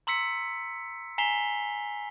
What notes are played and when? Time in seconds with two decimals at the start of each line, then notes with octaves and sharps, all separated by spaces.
0.07 A#5 C6 E6 B6 C#7
1.18 G#5 A#5 B6 C7 F7 G7